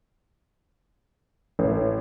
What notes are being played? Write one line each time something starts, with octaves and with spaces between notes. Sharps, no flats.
A1